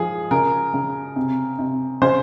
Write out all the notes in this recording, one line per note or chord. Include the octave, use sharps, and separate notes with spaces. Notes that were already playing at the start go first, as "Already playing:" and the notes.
Already playing: F3 G#4
C#3 A#4
C#3
C3
C3
C#3 C5